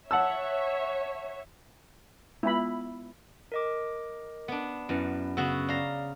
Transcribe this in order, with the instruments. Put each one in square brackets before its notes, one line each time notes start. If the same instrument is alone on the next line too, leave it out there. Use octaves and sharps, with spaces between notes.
[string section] C#5 E5 [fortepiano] F#5 A5 E6
[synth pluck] G#3 B3 F4 [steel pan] E4 B5
[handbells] A#4 D#5 D6
[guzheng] B3 D4
[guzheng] F#2 [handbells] B3 E4 B4
[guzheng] C#3 B3 F#4 [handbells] E6
[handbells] D5 [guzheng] F5 A#5